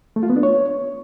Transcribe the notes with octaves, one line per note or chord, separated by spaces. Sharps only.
A3
F4
B3
D4
C#5